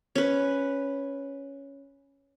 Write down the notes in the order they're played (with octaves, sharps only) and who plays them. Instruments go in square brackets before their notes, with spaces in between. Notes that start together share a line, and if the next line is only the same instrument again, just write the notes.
[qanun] C#4 B4